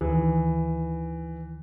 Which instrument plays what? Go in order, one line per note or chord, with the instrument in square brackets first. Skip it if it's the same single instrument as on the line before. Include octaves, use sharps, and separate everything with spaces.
[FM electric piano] D2 D#3 [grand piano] E3